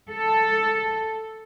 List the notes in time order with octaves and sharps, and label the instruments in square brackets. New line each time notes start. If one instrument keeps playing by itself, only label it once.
[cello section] A4